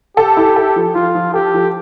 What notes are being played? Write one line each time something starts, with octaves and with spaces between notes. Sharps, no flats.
G4 A4
E4
A4
F3
F3 F4
F3
G4 A4
F3